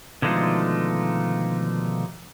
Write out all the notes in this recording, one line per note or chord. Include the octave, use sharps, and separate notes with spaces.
B2 D3 D#3 F3 G#3 A3